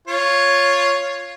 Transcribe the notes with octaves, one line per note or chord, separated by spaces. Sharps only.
F4 C#5